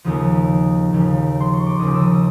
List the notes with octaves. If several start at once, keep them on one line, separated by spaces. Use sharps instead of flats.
D#2 C#3 F3 D#6
D#2 C#3 F3
C6
C#6
D6
D#2 C#3 F3 D#6
E6
D#6